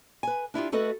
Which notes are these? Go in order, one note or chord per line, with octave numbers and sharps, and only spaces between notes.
B4 G#5
D4 E4 F4 G4
A3 F#4 A4 B4 D#5